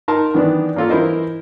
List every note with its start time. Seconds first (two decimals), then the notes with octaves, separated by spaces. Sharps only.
0.08 D#4 A#4 A5 C6
0.34 D#3 E3 B3 D4
0.76 A#3 C#4 F4 A4
0.90 E3 E4 A#4 C5 D#5